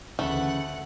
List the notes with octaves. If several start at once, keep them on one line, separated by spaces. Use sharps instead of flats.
D2 C#3 E3 A3 F#5